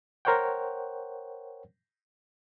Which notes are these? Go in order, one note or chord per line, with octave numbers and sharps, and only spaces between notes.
A#4 C5 C#5 F#5 G5